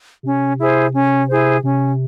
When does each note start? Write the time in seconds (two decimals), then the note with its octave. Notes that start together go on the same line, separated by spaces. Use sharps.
0.23 C3 C#4
0.58 E4 G#4 C5
0.94 C#4
1.28 E4 G#4 C5
1.63 C3 C#4